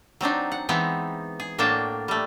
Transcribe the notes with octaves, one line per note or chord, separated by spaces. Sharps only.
F#3 C4 D4 D#4
F#5
E3 G#3 B3 C4 D#4
G#4
A2 A#3 D4 F#4 G5 A5
G3 A3